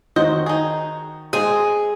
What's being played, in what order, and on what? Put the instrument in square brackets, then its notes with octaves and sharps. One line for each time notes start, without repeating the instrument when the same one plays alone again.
[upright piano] D#3 F#4 G6 [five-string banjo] F#3 C5 D#5
[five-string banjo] D#4 G#4
[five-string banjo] G#3 C4 [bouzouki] G#4